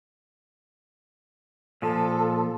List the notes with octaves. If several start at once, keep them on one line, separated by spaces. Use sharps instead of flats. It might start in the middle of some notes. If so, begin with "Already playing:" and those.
A#2 F3 A4